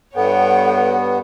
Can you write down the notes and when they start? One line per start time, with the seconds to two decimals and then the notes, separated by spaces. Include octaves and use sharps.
0.16 G2 B3 A4 C#5 F#5 G5